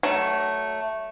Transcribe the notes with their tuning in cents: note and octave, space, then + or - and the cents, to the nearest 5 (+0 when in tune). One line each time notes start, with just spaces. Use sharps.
F#3 +20 A3 +0 F#5 +0